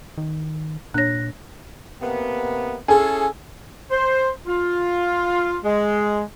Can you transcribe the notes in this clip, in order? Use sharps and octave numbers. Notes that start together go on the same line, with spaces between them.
D#3
A#2 D4 C#5 F#6 A#6
C3 A#3 B3
C#4 E4 G#4 A4
C5
F4
G#3